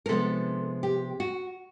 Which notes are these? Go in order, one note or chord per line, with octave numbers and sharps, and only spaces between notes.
A#4
C3 F3 G#3 B3 D4 A4
G4
F#4